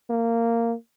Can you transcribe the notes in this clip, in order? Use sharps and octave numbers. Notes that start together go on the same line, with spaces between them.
A#3